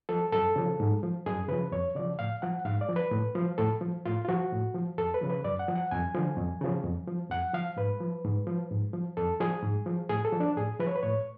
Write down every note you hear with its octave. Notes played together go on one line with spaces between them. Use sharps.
F3 A4
F#2 A4
C#3 F3
G#2
F3
F#2 G#4
C#3 F3 B4
F2 C#5
C#3 F3 D5
A2 F5
F3 F#5
G#2 F5
D5
F3
B4
A2
F3
A2 A4
F3
A2 F4
F4
F3 F#4
A2
F3
F2 A4
B4
C#3 F3
B4
F#2 D5
F#5
F3
F#5
F2 G#5
D3 F3
F2
C#3 F3
F2
F3
F2 F#5
F3 F5
G#2 B4
F3
G#2
F3
G#2
F3
F2 A4
F3 G#4
G#2
F3
A2 G#4
A4
F3
D4
A2 G#4
F3 B4
C#5
B4
A2 C#5